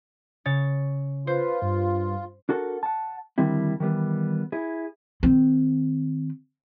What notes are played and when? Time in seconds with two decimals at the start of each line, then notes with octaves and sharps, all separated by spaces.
0.45 C#3 C#5 A6
1.27 F4 B4 C5
1.62 G2
2.49 D4 F#4 A4 A#4 F#5
2.83 F#5 A5
3.38 D3 D#3 G3 C4 E4
3.80 D#3 E3 G3 B3
4.52 E4 G#4
5.23 D#3 C4